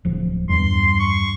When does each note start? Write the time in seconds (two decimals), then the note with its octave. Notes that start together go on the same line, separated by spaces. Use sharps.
0.05 D1 F3
0.49 E2 G2 C6
0.99 C#6